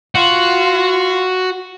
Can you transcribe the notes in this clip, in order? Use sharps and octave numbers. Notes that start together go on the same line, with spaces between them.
F4 F#4